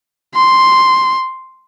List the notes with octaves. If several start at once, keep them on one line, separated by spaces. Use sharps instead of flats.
C6